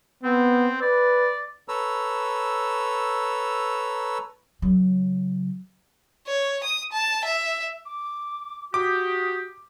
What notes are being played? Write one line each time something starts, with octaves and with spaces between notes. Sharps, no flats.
B3 C4
B4 D5
A4 B4 C#5 A#5 E6
C#3 F#3
C#5
D#6
A5
E5
D6
F#4 G4 D6 D#6